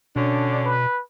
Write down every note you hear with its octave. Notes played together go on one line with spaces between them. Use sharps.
B2 D3 C#4 D4
B4